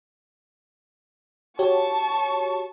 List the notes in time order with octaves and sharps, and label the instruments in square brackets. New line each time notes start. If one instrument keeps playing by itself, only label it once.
[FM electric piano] F#4 G4 C#5 [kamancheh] A5 C#6